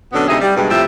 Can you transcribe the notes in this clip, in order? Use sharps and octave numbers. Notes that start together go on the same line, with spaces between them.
B2 D3 F#3 B3 C#4 D4
D2 C3 D#4 G#4 D#5 E5
G3
G2 B2 G#3
A2 C3 F3 G4 E5